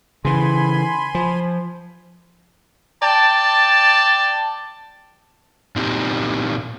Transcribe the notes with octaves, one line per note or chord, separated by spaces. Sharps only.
C#3 E3 G#5 B5 C6
F3
D5 G5 A5
A#2 C4 D#4 G4